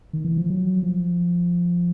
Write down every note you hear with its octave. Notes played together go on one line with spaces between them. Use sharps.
D#3
E3
F3
F#3
F3